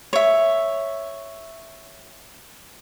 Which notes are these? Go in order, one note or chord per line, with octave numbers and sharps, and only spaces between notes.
C#5 E5